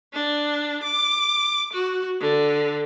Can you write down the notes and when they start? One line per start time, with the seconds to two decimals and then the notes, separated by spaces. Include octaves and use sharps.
0.14 D4
0.83 D6
1.73 F#4
2.20 D3